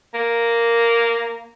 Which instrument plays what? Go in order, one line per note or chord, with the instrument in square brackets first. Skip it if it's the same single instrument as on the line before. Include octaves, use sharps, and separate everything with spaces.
[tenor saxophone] A#3